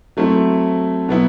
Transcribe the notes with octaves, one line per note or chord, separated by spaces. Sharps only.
F#3 A3 C4 E4
B2 F#3 B3 E4